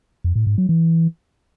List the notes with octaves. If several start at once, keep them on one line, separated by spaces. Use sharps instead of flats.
F2
A2
G#2
F#3
E3